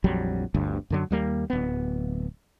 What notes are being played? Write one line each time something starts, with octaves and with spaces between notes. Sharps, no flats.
A#1 F2 F#3 G3
G1 D2 G2
F#2 D3 F#3
D#2 G3 A#3
D1 B3